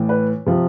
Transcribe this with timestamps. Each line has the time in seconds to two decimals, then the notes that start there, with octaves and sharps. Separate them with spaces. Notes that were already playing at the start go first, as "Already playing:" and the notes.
Already playing: A2 E3
0.09 B4
0.46 C3 F3